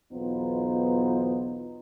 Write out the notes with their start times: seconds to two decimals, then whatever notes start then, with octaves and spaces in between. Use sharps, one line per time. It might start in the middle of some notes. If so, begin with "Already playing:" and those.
0.13 B1 E2 B3 D#4 F4 C5